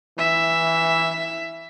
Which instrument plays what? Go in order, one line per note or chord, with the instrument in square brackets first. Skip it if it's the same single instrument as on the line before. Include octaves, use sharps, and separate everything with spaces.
[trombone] E3 [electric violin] E5